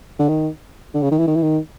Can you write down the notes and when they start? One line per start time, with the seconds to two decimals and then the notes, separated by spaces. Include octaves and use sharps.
0.19 D3
0.28 D#3
0.94 D3
1.02 C#3
1.11 D#3
1.18 E3
1.28 D#3
1.35 E3
1.43 D#3